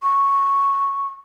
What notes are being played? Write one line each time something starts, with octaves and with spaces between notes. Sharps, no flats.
C#6